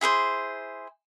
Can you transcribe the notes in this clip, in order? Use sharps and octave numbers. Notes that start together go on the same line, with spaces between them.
E4 G#4 B4 C5